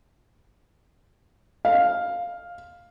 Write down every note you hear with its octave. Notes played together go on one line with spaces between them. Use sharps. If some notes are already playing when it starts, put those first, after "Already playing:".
F5